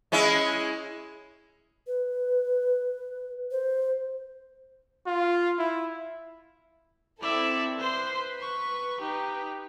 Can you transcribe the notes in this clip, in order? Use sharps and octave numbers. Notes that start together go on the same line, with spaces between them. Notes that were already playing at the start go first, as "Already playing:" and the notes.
G#3 C#4 E4
B4
C5
F4
E4
C4 E4 A4 D5 E5
B4 C5 C6
C#6
D#4 G4